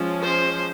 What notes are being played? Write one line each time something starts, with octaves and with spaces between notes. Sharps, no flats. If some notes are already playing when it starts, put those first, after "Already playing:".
Already playing: F3 G#3 C#4
C5